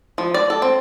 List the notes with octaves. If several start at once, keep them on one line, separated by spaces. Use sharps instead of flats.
F3
D5
A4
C4